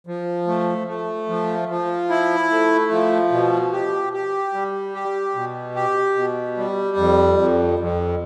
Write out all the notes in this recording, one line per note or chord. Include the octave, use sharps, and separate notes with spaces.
F3
A3
A3
F3
F3
E4
A3
F3
B2
G4
G4
G3
G4
B2
G4
B2
G3
F2
F2
F2